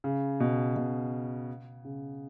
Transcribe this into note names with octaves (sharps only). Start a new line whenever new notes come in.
C#3
B2
B2
C#3